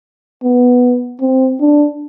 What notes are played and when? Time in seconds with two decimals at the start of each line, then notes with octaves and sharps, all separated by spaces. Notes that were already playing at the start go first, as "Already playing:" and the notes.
0.43 B3
1.21 C4
1.60 D4